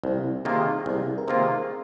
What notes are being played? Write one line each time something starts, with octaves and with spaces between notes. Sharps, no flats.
C2 C4
C3 D#3 A#3 F4 G#4
C2
A#4
C3 D#3 A#3 F4 C5